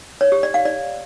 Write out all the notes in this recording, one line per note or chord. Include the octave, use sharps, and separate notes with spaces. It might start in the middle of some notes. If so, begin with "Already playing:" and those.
C#5
G4
D5
F5
D5